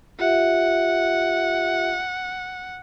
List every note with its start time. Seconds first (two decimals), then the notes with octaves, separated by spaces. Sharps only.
0.19 F4 G4 E5 F#5